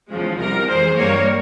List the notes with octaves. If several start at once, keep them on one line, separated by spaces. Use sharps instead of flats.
E2 C#3 F3 G#3
C2 C3 G3 A#4
F2 E3 G#3 G#4 C5
G2 G3 A#3 A#4 C#5